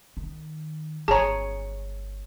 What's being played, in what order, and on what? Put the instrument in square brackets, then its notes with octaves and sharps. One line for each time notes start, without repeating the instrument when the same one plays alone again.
[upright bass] D#3
[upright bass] G1 [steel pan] G#4 C#5 [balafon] A5 A#5